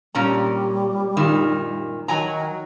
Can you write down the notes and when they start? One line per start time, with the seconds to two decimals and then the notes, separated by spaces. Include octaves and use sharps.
0.15 A#2 G3 C#4 A#5
1.17 F#2 A#2 D#3
2.08 D#3 F#3 G#5 A#5